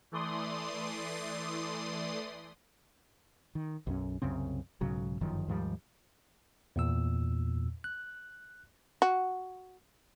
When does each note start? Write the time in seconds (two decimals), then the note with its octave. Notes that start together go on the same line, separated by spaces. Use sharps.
0.12 E3 A3 D5 C6 D#6
3.55 D#3
3.87 B1 F#2 C#4
4.22 C2 F#2 C#3 C4
4.81 B1 G#2 C#3 F#3
5.21 G1 F#2 D#3 F3
5.48 D#2 G#2 F3 G3
6.76 E2 A#2 E6
7.84 F#6
9.02 F#4